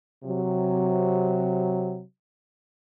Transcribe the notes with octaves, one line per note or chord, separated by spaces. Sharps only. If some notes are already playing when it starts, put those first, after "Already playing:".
C3 F#3